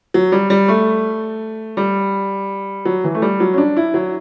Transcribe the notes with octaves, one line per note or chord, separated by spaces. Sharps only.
F#3
G3
G3
A3
G3
F#3
E3
A3
G3
F#3
C#4
D4
E4
F#3